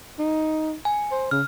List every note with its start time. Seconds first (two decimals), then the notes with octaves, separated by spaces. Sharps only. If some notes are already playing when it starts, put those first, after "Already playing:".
0.19 D#4
0.85 G#5
1.11 C5
1.31 C#3 F6